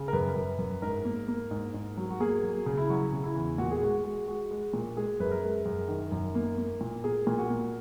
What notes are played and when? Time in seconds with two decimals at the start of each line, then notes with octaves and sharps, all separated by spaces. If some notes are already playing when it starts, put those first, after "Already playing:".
Already playing: C#3
0.08 A#4
0.13 F#2 B4
0.36 F#2
0.59 F#2
0.82 G#2 A#4
1.05 A#3
1.28 A#3
1.51 G#2
1.74 G#2
1.97 F#3
2.11 F#4
2.20 A#3 G#4
2.43 F#3
2.66 C#3
2.78 E4
2.90 F#3 F#4
3.12 C#3
3.24 E4
3.35 E2
3.58 A#2 F#4
3.72 G#4
3.81 G#3 F#4
4.04 G#3
4.28 G#3 F#4
4.51 G#3
4.74 A#2
4.97 G#3 G#4
5.20 F#2 B4
5.31 A#4
5.43 G#3
5.65 F#2
5.89 D#3
6.12 F#2
6.35 A#3
6.58 A#3
6.81 A#2
7.04 A#3 G#4
7.27 A#2
7.38 F#4
7.50 A#3